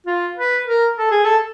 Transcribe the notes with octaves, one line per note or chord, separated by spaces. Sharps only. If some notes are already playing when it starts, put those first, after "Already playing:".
F4
B4
A#4
A4
G#4
A4